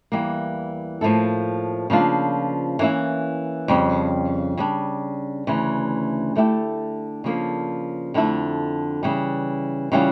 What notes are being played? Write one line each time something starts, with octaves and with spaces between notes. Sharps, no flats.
E2 E3 G3 A#3
A2 F3 A#3 E4 A4
C#3 F3 A#3 D4 F4
E3 A#3 C#4 E4
F2 C#3 G3
C#3 G3 D4
D2 C#3 E3
D3 A3 E4 G4
C#3 F3 A#3 D4 A4
F2 D3 A3 E4
C#3 E3 G3
C#3 E3 G3 C#4 F4